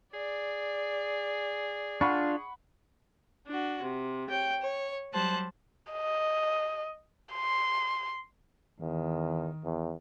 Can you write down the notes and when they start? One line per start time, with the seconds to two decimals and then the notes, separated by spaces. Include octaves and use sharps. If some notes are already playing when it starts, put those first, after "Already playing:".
0.14 G#4 D5
2.01 D4 F4 F#5 B5 C#6
3.48 D4 F#4
3.84 C3
4.28 C#5 G5
4.60 C#5
5.12 F#3 G3 C5 A5 F#6
5.92 D#5
7.34 C6
8.81 E2 D#3
9.64 E2